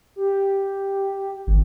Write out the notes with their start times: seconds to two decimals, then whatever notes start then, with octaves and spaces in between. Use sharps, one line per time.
0.16 G4
1.47 G#1